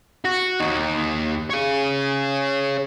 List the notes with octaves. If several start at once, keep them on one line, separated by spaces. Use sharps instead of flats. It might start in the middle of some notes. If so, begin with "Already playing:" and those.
F#4
D#2 D#4
G#4 C#5